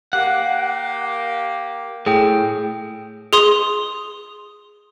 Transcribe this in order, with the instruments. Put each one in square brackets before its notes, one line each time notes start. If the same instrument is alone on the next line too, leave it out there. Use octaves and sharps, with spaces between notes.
[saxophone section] A#3 G4 [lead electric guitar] F#5
[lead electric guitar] A2 [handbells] G#4 G5
[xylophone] G#4 C6 D#6